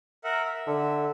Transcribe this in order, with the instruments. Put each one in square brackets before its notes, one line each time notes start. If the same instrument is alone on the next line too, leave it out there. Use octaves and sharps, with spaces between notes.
[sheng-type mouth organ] A#4 E5 F#5
E5
[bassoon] D3